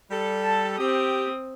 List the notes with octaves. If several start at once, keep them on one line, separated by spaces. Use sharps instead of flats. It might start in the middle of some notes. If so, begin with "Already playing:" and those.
G3 A4
A5
C4 G4 D#6